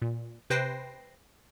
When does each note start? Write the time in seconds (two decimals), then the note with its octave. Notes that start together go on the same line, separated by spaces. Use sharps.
0.02 A#2
0.50 C3 B4 C5 G5 A#6 C7